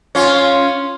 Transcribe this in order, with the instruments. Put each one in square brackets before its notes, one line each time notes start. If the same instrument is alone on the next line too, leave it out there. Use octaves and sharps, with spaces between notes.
[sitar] C#4 F4